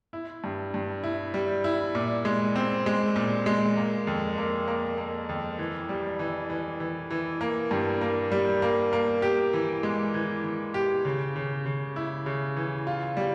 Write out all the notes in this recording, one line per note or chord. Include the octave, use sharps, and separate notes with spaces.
E4
G2
G2
E4
G3
E4
A#2
G#3
C4
G#3
A#2
G#3
A#3
F2
A#3
A#3
A#3
F2
E3
G3
E3
E3
E3
E3
A#3
G2
A#3
G3
A#3
A#3
G4
E3
G#3
E3
E3
G4
C#3
C#3
C#3
E4
C#3
E3
F4
G3